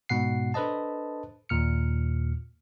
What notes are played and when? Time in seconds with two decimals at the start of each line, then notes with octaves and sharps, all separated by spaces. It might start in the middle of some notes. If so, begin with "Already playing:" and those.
0.09 G#2 B2 F#5 C7
0.54 D4 A4 B4 C5 D#5 A5
1.49 D#2 A#2 F6 C#7